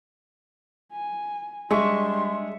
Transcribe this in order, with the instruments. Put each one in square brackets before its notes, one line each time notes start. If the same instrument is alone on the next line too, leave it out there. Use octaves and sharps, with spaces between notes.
[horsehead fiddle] G#5
[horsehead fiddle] G3 D4 [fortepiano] G#3 [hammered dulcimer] E5 C#6 [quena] C6